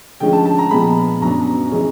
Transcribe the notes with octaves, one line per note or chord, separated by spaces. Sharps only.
D3 F3 G#3 C#4 G5
A5
A5
A#5
A#2 F3 G#3 B3 B5
F#2 D3 F#3 B3 D4 A#5
E3 G#3 C#4